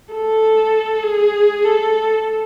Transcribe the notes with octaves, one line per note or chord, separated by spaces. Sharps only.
A4
G#4
A4